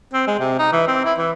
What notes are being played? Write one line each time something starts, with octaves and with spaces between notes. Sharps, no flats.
C4
G#3
C3
D#4
E3
C4
E4
E3